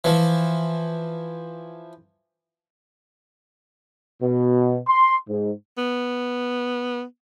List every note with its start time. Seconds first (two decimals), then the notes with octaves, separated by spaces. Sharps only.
0.04 E3 F3
4.22 B2
4.88 C6
5.29 G#2
5.78 B3